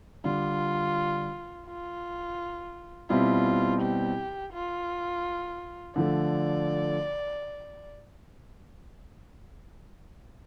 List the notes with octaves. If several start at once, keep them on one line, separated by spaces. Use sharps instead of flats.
D3 G3 D4 F4
F4
B2 G3 C4 E4 F4
G4
F4
D3 F3 A3 D5